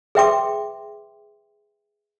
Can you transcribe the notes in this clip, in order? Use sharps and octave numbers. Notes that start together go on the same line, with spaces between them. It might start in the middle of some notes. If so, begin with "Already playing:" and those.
G#4 B4 E5 G5 C6 D6